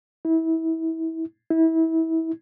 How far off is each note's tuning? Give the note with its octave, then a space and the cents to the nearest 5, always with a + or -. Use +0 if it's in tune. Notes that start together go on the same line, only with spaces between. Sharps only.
E4 -25
E4 -25